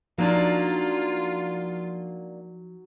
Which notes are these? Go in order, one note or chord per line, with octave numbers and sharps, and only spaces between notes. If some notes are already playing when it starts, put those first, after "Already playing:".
F3 F#3 A#3 D4 D#4 F4